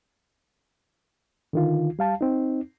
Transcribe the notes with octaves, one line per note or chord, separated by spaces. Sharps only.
D3 D#3 F4
G3 F5 A5
C4 D#4